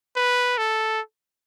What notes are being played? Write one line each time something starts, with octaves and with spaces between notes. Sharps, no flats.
B4
A4